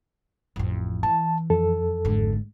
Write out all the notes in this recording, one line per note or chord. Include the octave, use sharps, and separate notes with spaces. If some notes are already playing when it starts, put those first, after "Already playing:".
A1 F2
E3 A5
F2 A4
G#1 D3